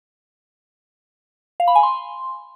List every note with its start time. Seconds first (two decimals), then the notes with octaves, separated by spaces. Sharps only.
1.60 F5
1.68 B5
1.75 G#5
1.83 C6